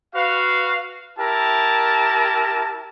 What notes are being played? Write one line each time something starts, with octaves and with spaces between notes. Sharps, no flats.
F#4 B4 F5
E4 G4 A#4 A5